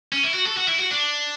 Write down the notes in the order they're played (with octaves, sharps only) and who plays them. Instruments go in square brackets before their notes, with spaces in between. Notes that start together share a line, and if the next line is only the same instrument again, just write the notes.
[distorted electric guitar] C#4
E4
F#4
A4
F#4
E4
F#4
D4